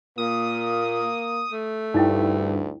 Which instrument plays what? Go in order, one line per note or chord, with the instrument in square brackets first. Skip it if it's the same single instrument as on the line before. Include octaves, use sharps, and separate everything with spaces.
[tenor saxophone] A#2 [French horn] A#3 [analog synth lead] D#6
[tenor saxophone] A3
[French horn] D2 [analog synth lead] G2 [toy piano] D#4 E4 G5